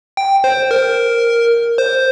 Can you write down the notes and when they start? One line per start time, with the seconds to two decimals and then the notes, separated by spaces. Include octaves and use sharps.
0.17 G5
0.44 C5
0.71 A#4
1.78 C5